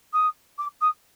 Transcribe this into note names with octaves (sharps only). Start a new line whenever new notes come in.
D#6
D6
D#6